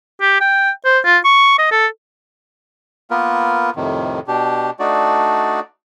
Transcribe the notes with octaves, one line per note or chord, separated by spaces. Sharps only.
G4
G5
C5
F4
C#6
D#5
A4
A#3 B3 F4 A#4 B4
F2 A2 C3 D#3
B2 D4 G4
A3 D4 D#4 F#4 D5